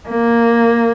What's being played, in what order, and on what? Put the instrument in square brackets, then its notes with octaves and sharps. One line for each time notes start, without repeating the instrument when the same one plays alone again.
[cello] A#3